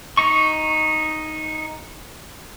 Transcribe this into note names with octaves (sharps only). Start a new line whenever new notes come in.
D#4 C#6